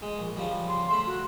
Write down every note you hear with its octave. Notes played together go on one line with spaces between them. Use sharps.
G#3
A#1
C#3 F3 G3
C6
A3 B5
F#4